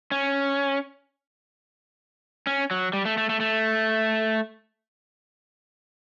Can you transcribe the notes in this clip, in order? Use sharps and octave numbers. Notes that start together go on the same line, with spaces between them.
C#4
C#4
F#3
G3
A3
A3
A3
A3